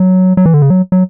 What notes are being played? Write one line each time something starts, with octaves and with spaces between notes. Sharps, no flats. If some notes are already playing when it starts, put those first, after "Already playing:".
Already playing: F#3
F#3
E3
D3
C#3
F#3
F#3